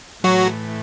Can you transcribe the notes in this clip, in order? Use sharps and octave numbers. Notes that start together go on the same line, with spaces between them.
A2 E3 F#3 A3 F#4